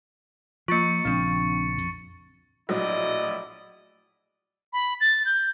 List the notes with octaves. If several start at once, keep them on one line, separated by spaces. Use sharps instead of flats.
F3 A#3 F4 C#6 A6 C#7
A#1 C#3 F3 C4 D4
F2
A#1 A2 F#3 E4 D5 D#5
B5
A6
G6